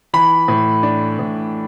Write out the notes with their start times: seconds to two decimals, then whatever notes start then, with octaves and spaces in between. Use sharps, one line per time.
0.13 E3 B5
0.48 A2
0.83 D4
1.19 A2